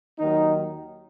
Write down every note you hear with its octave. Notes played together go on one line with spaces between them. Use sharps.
D#2 D#3 F#3 D#4